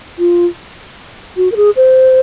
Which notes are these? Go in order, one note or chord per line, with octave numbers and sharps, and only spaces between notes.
F4
F#4
A#4
G#4
C5